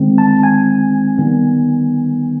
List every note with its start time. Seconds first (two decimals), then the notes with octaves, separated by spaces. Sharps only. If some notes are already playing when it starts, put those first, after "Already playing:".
Already playing: D#3 G#3 C4
0.18 A5
0.43 G#5
1.18 D#3 G3 B3